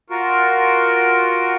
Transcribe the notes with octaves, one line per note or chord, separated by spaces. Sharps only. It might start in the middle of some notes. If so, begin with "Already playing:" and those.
F4 F#4 A#4